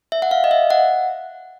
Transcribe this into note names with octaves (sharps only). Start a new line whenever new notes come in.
E5
F#5
F5
D#5
E5
F#5